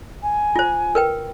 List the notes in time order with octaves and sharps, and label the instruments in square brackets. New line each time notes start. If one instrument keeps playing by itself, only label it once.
[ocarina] G#5
[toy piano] F4 C5
A#4 B4 G5